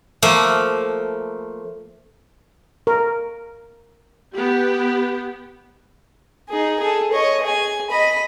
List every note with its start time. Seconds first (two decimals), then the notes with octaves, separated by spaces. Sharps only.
0.22 F3 A3 A#3
2.87 A#4
4.35 B3 G4
6.49 D#4 G#4
6.80 G#4 A4
7.12 C#5 D#5
7.43 G#4 G#5
7.90 D#5 B5